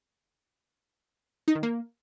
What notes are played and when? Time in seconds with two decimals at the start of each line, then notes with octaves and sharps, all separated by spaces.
1.48 D#4
1.55 D#3
1.63 A#3